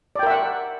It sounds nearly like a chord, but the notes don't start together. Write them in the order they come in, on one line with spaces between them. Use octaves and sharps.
D5 G5 A#4 E5 F#5